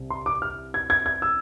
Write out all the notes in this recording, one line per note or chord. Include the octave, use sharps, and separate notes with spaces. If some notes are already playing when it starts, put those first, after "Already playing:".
Already playing: C2 C3
C6
D6
F6
G#6
G#6
G#6
E6